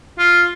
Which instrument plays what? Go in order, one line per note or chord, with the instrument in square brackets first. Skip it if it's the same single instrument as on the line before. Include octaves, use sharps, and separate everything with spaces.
[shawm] F4